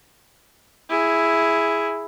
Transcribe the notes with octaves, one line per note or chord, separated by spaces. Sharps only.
E4 G#4